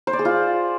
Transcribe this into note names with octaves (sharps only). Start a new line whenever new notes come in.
C5
D5
G#4
F4